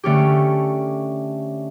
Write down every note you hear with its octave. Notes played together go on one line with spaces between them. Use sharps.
D3 A3 C#4 G4